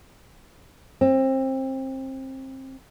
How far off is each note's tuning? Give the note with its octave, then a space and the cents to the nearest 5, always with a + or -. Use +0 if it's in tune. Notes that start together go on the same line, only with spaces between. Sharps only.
C4 +25